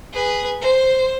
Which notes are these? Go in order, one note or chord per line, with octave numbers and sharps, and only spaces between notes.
G#4 B4
C5